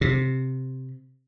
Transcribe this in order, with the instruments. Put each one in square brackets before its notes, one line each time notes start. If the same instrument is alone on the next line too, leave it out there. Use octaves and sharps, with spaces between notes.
[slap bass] C3